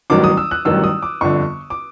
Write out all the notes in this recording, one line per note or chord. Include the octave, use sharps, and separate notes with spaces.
A1 G2 D#3 F#3 D6
D#6
E6
F#6
A1 G2 D#3 F#3 E6
D#6
D6
G1 F2 D3 C#6
D6